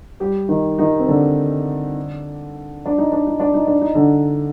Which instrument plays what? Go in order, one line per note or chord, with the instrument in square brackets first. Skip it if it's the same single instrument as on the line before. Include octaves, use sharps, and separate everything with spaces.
[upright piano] G3 G4
D#3 D#4
D#3 D#4
C4
D3 D4
D4
D#4
D4
D#4
D4
D#4
D4
D#4
D3 D4